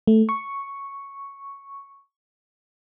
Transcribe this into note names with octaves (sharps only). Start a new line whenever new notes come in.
A3
C#6